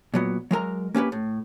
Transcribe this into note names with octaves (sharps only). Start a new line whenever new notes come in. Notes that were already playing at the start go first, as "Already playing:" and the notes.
A#2 F#3 B3
F#3 G#3 A#4 A#5
A#3 C#4 G4 B4
A2